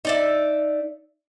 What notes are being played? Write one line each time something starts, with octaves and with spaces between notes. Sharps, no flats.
D#4 D5 E5